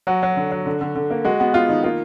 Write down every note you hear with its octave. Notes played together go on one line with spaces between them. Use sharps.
F#3 F#4
F#3
D3
F#3
D3
D3
D3
A#3
G#3 F#4
B3 F#4
B3 F4
D#3 D#4
A#3 F4